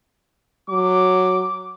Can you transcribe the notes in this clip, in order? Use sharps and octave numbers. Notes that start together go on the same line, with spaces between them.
F#3 D6